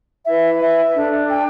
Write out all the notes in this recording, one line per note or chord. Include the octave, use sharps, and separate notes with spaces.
E4 B4 E5
E5
D4 A4
G5